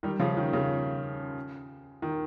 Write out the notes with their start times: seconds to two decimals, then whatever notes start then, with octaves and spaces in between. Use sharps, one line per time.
0.03 D#3 G3
0.20 C#3 F3
0.37 D#3
0.53 C#3
2.02 D#3